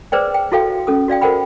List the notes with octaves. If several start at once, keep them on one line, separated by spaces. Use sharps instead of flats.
G#4 B4 C5 D5 G5
G5
E4 F#4 A4 F5 G5
C#4 A4 D#6
F#4 D5 F5 G5
A4 A#4 C5 F#5 G5 B5